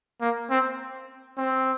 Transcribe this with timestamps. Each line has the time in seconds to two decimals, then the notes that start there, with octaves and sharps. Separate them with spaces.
0.21 A#3
0.50 C4
1.37 C4